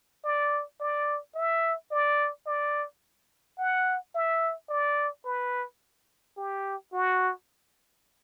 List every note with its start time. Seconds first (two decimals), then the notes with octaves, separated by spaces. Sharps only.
0.24 D5
0.80 D5
1.35 E5
1.91 D5
2.46 D5
3.58 F#5
4.15 E5
4.69 D5
5.25 B4
6.37 G4
6.93 F#4